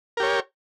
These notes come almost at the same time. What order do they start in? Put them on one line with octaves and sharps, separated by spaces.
A#4 G4 C#5